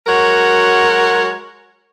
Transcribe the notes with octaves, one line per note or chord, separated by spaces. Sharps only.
F#3 G#3 F#4 A#4 C#5 F#5